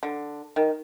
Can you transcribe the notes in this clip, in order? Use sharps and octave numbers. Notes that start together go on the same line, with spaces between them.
D3
D#3